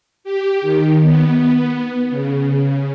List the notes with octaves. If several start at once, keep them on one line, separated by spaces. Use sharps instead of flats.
G4
D#3
B3
C#3